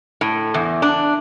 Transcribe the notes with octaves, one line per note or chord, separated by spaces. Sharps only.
A2
E2
D4